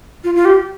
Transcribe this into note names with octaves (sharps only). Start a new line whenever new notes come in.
F4
F4
G4